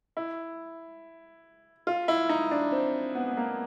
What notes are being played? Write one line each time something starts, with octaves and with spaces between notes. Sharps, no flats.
E4
F4
E4
D#4
D4
C4
B3
B3
A#3